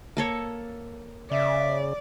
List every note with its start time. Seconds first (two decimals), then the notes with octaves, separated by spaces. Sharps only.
0.17 A#3 A4 C#5
1.31 C#3 D5 E5